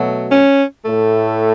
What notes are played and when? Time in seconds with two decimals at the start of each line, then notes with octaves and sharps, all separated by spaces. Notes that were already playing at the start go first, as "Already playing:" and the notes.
Already playing: B2 F#3 A3
0.32 C#4
0.84 A2 A3